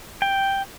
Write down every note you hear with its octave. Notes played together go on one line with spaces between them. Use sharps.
G5